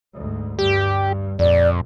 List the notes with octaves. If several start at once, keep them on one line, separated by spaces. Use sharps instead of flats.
D2 G#2
G2 G4
A#1 F2 D5